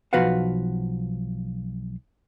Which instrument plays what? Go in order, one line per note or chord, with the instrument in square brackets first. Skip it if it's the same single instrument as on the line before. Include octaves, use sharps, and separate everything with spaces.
[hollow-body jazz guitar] B1 F3 F#4 B4 F5 F#5